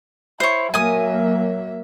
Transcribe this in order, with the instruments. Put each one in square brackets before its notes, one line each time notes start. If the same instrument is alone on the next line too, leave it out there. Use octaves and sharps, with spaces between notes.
[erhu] E4 [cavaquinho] C5 C#5
[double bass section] F#3 A#3 [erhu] E5 [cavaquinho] G#5 D#6